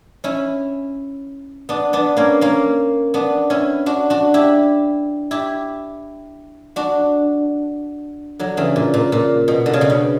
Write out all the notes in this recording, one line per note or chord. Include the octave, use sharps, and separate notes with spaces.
C#4 E4
B3 D4
B3 D4
A#3 C#4
A#3 C#4
B3 D4
C#4 E4
D4 F#4
D4 F#4
E4 G4
E4 G4
D4 F#4
D3 F#3
C#3 E3
A#2
A#2
A#2
B2
D3
C#3
B2
C#3